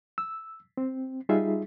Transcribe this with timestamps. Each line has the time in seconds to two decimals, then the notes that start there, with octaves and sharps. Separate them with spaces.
0.18 E6
0.77 C4
1.29 G3 D#4 F4 G#4 E5